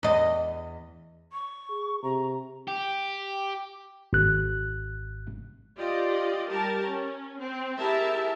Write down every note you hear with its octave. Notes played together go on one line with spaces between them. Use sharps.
E2 D#5
C#6
G#4
C3 A#5
G4
G#1 F#6
F4 G4 D5 D#5
G3 G4 A#4 A5
C#4
C4
E4 G4 G#4 A#4 E5 A5